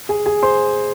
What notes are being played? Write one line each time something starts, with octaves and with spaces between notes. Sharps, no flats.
G#4 G#5
G#4 G#5
C5 C6